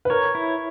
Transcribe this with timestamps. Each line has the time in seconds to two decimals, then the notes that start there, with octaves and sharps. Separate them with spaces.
0.05 B4
0.10 A#4 C#5
0.35 E4